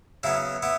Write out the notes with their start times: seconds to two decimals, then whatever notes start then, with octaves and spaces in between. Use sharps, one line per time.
0.23 C#3 F#3 B3 E4
0.62 B3 E4